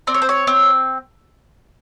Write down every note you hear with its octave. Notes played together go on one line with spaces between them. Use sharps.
C4 D5
C#5
C5
C#5
C4